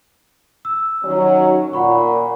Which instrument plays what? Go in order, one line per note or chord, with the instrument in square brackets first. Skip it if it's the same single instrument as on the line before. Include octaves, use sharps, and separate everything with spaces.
[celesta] E6
[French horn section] D#3 F#3 C#4
[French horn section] A#2 [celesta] F#5 B5 C#6